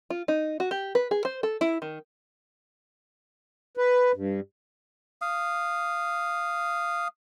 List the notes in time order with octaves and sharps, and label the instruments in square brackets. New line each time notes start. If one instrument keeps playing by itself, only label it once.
[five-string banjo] F4
D#4
F#4
G4
B4
G#4
C5
A4
E4
D#3
[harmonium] B4
G2
[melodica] F5 D#6